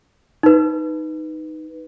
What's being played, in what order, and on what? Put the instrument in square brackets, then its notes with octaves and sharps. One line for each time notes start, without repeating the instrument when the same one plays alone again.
[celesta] D#4 B4